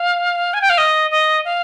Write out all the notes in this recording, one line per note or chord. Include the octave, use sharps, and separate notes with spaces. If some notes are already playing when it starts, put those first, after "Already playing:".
Already playing: F5
G#5
G5
F5
D#5
D#5
F5